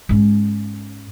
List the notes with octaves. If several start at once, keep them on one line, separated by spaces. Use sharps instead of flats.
G#2 C#4